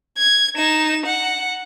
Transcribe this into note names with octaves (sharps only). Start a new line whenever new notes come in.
G#6
D#4 E7
F#5